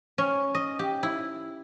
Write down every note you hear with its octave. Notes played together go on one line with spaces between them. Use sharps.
C#4
D#5
G4
E4